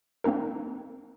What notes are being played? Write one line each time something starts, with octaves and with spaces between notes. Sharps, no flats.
A#3 C4 D4 D#4 A#4